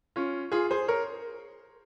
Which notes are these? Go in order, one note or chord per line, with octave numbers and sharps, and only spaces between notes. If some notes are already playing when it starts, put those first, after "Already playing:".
C#4 F4
F4 G#4
G#4 C5
A#4 C#5